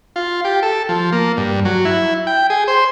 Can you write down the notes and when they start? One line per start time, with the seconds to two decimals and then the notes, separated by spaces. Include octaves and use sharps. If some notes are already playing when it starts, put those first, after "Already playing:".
0.16 F4
0.45 G4
0.63 A4
0.89 F3
1.13 A#3
1.37 G2
1.65 F#3
1.85 E4
2.27 G5
2.50 G#4
2.68 C5